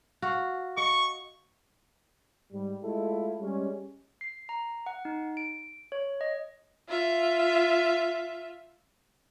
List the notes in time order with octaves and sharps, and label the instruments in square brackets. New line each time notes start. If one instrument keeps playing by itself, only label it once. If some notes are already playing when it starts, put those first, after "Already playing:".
[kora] F#4 F5
[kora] D#5 [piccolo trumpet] C#6
[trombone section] G#2 G3
G#3 A3 E4 F4 A4
G3 G#3 C#4
[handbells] C7
A#5
F#5
D#4
D7
C#5
D#5
[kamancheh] F4 E5